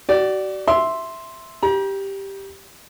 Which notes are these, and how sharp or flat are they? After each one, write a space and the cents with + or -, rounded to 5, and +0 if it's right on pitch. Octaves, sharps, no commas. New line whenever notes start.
F#4 +40 D5 +0
E5 +0 C6 +0
G4 +0 A#5 +40